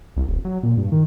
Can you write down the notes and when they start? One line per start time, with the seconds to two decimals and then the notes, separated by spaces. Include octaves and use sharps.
0.16 C2
0.29 D#1
0.45 F#3
0.63 A#2
0.77 G2
0.92 D#3